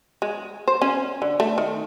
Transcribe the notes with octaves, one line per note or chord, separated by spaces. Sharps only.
G#3
C5
C#4
D3
A3
D#3